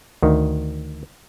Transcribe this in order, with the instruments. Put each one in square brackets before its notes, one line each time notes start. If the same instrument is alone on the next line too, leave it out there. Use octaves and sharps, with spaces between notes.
[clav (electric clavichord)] D2 D#3